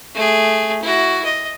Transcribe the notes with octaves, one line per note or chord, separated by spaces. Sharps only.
A3 G#4
E4 F#4
D#5